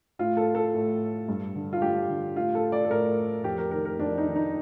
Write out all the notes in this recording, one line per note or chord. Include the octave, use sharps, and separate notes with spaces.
A2 F4
A4
A4
A2
G2
D3
F4
G2 G4
D3
A2 F4
A4
D5
A4
A2 A#4
F2 G4
A#4
D#3 A#4
A#4
F2 D4
D#4
D#3
D#4